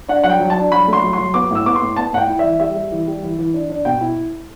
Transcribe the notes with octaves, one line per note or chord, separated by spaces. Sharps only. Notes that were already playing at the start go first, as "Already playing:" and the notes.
D4 F#5
F#3 F#5
G5
F#3
A5
D4
F#3 B5
A3
C6
F#3
F#3 C6
B3 D6
A2 E6
B3 D6
C6
A2
B3 A5
A2 F#5
G5
E4
E3 E5
G3 E5
G3
E3
G3
E3
E3
D4
D4
B2 G5
E4